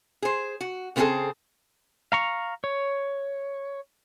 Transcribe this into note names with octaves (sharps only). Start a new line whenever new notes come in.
G#4 C5
F#4
C#3 B3 C4 E4 G#4 A4
F5 A#5 C#6
C#5